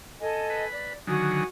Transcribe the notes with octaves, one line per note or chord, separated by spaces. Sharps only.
A4 D#5 G#5
B4
D5
D3 D#3 F#3 F#4 G#5 D#6